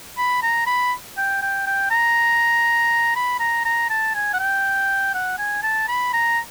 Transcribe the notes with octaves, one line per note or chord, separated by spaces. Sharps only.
B5
A#5
B5
G5
G5
G5
A#5
B5
A#5
A#5
A5
G#5
F#5
G5
F#5
G#5
A5
B5
A#5